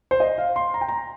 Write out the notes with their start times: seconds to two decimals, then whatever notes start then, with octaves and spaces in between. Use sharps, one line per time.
0.11 C5
0.20 D#5
0.38 F5
0.56 C6
0.74 A#5
0.81 G5
0.89 A#5